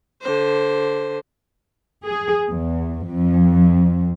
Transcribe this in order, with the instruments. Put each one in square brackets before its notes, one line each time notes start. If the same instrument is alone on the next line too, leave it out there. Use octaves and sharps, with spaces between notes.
[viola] D3 C5
[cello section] G#4
E2
F2